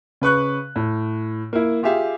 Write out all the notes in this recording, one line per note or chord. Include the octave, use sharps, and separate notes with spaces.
C#3 B4 C#6 F#6
A2
A#3 E4
F4 G4 G#4 E5 F5